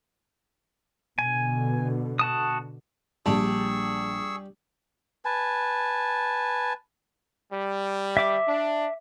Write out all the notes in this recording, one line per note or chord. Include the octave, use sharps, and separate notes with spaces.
B2 D3 G#5
F#4 A5 D#6
A#1 G3 G#4 A5 C#6 E6
B4 G#5 A5
G3
E5 D6
D4